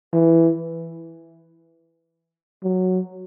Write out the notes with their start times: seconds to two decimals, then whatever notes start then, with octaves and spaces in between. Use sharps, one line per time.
0.13 E3
2.64 F#3